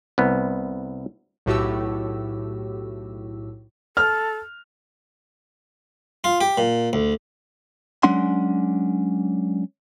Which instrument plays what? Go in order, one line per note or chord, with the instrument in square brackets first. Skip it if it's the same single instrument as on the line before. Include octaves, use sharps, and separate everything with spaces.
[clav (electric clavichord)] C2 B3
[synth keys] B1 A2 F#4 G4 E6
[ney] A4 [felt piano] F6
[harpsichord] F4
G4
A#2
D2
[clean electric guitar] F#3 G#3 C#4 D4 F#5 C6